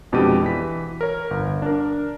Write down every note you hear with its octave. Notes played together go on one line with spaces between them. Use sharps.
F2 B2 G#3 D4 G4 D#7
E3 B6
A#4 C#5
G1
D4 A#4